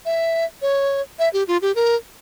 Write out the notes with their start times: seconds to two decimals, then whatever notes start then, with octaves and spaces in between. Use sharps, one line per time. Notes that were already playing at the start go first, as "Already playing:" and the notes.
0.05 E5
0.62 C#5
1.19 E5
1.33 G4
1.48 F4
1.62 G4
1.76 A#4